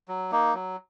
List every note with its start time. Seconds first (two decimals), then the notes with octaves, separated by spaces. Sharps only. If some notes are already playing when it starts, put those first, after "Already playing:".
0.08 F#3
0.31 A#3 D#4
0.54 F#3